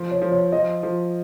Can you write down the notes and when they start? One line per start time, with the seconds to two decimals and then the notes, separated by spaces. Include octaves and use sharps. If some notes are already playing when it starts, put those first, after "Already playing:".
Already playing: F3
0.11 C#5
0.22 F3
0.32 C#5
0.52 F3 D#5
0.83 F3